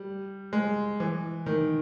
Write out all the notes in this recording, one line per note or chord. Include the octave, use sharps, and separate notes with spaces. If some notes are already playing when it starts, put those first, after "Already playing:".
Already playing: G3
G#3
E3
D#3